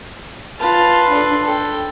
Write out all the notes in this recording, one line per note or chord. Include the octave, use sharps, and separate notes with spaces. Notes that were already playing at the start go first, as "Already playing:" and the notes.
F4 B4 A5 C6
D4 A4
A4 G5